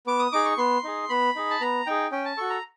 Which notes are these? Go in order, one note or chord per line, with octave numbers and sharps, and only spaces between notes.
B3 D6
D#6
D#4 G#4 D6
C#6
B3 C6
D#4 G#4
B3 B5
D#4 G#4
A5
B3 A#5
D#4 G#4 G5
C#4 G5
A5
F#4 A4 C#6
A#5